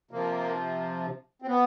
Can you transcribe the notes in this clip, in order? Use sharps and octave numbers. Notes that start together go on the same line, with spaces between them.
C3 F3 A#3
C4
B3